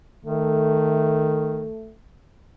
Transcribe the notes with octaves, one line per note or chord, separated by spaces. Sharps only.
D#3 A3